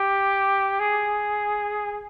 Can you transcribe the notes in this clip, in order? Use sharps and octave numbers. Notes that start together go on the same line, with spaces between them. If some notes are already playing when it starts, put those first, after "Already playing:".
Already playing: G4
G#4